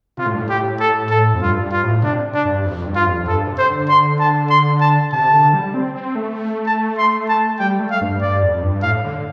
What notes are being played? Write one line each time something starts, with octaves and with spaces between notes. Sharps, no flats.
C3 F4
A2
G2
A2
G4
A4
A4
F2
G2 F4
G2
F4
A2
C3 D4
D4
G2
F2
G2
F4
F2
F2
G2 A4
C3
C5
D3
C6
A5
C6
A5
C3 A5
D3
G3
C4
C4
A3
A5
C6
A5
G3 G5
A3
F5
G2
G2 D5
F2
G2
A2 F5
D3